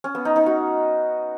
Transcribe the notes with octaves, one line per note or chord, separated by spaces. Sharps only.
C#4
B3
D#4
D#4
F#4